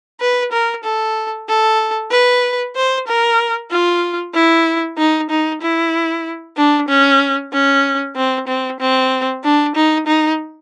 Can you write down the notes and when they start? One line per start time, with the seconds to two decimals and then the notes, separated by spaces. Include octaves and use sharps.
0.20 B4
0.52 A#4
0.84 A4
1.48 A4
2.11 B4
2.76 C5
3.07 A#4
3.71 F4
4.34 E4
4.98 D#4
5.30 D#4
5.62 E4
6.57 D4
6.88 C#4
7.53 C#4
8.16 C4
8.48 C4
8.80 C4
9.44 D4
9.75 D#4
10.07 D#4